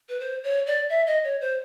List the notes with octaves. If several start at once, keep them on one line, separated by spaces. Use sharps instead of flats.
B4
C5
C#5
D5
E5
D#5
C#5
C5